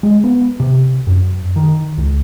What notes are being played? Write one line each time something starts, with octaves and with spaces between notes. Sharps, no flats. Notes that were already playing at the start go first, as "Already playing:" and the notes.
G#3
B3
C3
F#2
D#3
C#2